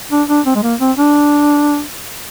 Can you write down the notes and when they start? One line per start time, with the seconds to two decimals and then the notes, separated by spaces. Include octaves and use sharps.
0.11 D4
0.29 D4
0.46 C4
0.55 G#3
0.62 A#3
0.80 C4
0.97 D4